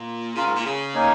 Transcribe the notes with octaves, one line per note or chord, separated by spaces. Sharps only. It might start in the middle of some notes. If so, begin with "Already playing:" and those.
Already playing: A#2
C#3 F4 A#4 F5
G#2
A#2
C#3
A#3 D#4 C#5 G#5